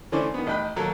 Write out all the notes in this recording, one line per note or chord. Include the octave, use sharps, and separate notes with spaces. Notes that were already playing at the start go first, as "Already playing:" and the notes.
D3 E3 A3 C#4 C5 D5
D#3 B3
A1 D#4 G5 B5 F#6
D#2 F#3 A4 A#4